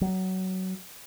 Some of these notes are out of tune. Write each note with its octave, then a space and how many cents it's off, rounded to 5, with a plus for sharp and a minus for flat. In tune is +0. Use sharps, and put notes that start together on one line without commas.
F#3 +20